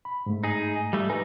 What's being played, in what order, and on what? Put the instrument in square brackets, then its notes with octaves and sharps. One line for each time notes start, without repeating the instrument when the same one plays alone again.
[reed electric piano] B5
G#2 A3
[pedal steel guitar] D#4 G#4
G3 A3
[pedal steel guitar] G3 D#4 [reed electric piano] B4 G#5